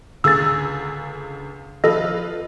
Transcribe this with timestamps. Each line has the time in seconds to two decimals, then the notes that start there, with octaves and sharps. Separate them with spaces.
0.24 C#2 D3 G#4 E6 A6
1.84 F3 F4 A4 B4 D#5